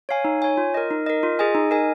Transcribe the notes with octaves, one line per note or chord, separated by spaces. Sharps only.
C#5 F5 G#5
D#4
C#5 G#5
F4
A#4 D#5
D#4
A#4 D#5
F4
G#4 D#5 G#5
D#4
A#4 D#5 G#5